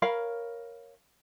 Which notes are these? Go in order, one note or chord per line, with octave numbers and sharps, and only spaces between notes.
A#4 C#5 F5 B5